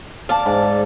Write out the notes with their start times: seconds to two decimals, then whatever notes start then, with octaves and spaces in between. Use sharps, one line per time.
0.29 D5 F5 A5
0.46 G#2